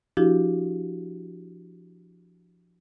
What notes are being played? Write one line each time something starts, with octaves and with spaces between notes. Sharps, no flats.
F3 D4 E4 F#4 G4